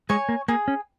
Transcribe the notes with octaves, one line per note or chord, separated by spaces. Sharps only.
G#3 C#5 G#5 C#6
A#3
A#3 G#4
C#4